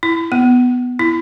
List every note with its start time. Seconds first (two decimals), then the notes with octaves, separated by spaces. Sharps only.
0.03 E4
0.32 B3
0.99 E4